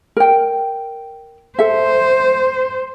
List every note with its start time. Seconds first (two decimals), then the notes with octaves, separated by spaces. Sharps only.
0.17 A#4 G5
1.59 A4 C5 E5